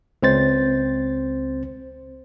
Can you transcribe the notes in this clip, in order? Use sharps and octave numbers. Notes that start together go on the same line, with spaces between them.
C#2 C4 C5 A6